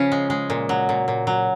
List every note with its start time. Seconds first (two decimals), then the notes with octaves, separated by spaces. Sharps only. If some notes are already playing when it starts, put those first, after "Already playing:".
Already playing: C#3 F3 C#4
0.12 G#3
0.30 G#3
0.50 A#2
0.69 F#3
0.89 A#2
1.08 A#2
1.27 F#3